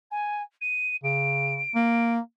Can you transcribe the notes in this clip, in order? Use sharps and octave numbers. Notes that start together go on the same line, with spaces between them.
G#5
D#7
C#3 D7
A#3